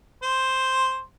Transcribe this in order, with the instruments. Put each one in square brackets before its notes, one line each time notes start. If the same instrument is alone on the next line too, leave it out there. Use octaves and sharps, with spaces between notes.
[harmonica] C5